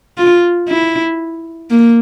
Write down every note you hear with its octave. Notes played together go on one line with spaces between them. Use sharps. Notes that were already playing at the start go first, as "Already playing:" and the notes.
F4
E4
A#3